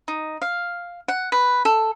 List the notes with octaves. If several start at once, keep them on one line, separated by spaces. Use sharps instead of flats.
D#4
F5
F#5
B4
A4